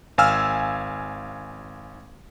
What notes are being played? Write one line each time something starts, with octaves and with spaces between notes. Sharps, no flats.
G#1 F5 G#5 E6 F6